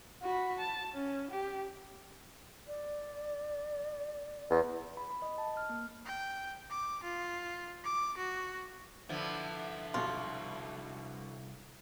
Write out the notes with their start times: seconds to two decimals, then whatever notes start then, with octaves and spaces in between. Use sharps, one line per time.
0.23 F#4 B5
0.59 A5
0.94 C#4
1.31 G4
2.67 D5
4.50 E2
4.97 B5
5.11 B5
5.22 D#5
5.38 A5
5.57 F6
5.70 A#3
6.05 G5
6.70 D6
7.03 F4
7.84 D6
8.17 F#4
9.09 C2 D3 F3 B3 E4
9.94 B1 G2 B2 F4